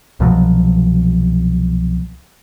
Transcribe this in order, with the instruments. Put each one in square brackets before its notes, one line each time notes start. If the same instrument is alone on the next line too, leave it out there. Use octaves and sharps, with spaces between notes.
[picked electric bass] C2 B2 F3 F#3